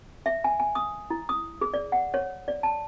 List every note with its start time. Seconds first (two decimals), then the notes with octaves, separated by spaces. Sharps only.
0.26 E5
0.44 G#5
0.60 G#5
0.75 D#6
1.10 E4
1.29 D#6
1.61 G#4
1.74 D5
1.92 F#5
2.14 C#5
2.48 D5
2.63 A5